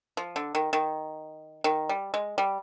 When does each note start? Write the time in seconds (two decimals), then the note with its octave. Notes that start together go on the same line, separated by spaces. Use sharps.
0.17 F3
0.36 D3
0.55 D#3
0.73 D#3
1.64 D#3
1.89 G3
2.14 G#3
2.38 G3